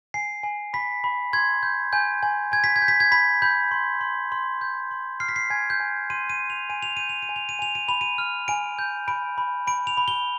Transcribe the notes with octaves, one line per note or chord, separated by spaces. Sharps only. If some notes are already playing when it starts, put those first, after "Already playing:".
G#5 C7
G#5
B5 B6
B5
C6 G#6
G6
G#5 G6
G#5
G#5 G#6
B6
G#6
G6
B6
G#6
B5 B6
B5 G6
C6
C6
C6
G6
C6
F6 C7
B6
C7
G#5 G#6
G6
G#5
C6 D#7
D#7
C6
F7
G#5 D#7
F7
G6 D#7
F7
D#7
G#5
F7
D#7
G#5 F7
D#7
B5 F7
D#7
F6
G#5 D7
G6
B5 D7
B5
B5 D7
F7
B5
G7